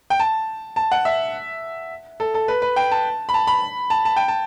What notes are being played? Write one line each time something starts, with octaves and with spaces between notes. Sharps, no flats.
G5
A5
A5
F#5
E5
A4
A4
B4
B4
G5
A5
B5
A5
B5
A5
A5
G5
A5